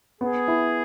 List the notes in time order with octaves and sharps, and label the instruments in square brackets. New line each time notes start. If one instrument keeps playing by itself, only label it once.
[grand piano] B3 [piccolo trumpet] G#4
[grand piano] E4